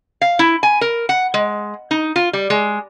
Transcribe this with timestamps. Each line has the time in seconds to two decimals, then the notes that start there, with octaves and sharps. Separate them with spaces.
0.22 F5
0.39 E4
0.63 G#5
0.81 A#4
1.09 F#5
1.34 G#3
1.91 D#4
2.16 F4
2.33 G3
2.50 G#3